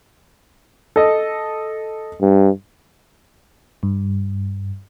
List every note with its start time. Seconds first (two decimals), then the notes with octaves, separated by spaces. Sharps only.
0.96 A4 D#5
2.22 G2
3.83 G2